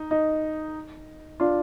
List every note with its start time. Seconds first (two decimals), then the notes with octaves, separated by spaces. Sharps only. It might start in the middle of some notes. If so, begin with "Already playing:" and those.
Already playing: D#4
0.11 D#4
1.40 D4 F4